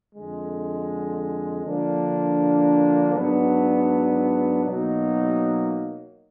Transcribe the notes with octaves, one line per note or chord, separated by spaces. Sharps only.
F2 D3 G#3
D3 F3 A#3 D4
G#2 F#3 B3 D4
B2 F#3 A#3 D#4